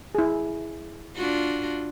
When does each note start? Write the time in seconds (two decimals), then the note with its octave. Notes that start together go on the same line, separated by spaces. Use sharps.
0.15 E4 G#4
1.16 D4 F4 F#4